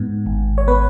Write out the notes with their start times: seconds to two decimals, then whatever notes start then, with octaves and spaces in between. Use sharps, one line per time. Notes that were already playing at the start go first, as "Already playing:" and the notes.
Already playing: G#2 B3
0.26 G#1
0.58 C#5
0.68 B3 B4